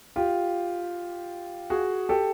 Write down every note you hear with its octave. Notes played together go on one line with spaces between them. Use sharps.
F4 G4
F#4 G#4
G4 A4